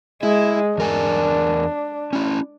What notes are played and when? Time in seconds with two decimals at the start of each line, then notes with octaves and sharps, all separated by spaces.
0.23 G#3 E4
0.78 E2 D4 A#4 G#5
2.13 C#4 E4